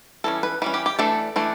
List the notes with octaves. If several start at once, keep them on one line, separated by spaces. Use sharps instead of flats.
E3 G3 C#4 A4
B4
E3 G3 C#4 B4
G4
G4
E3 A3 D4 A4
E3 A3 D4